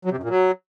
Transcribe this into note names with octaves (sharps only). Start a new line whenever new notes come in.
F#3
C3
F#2
A#2
F#3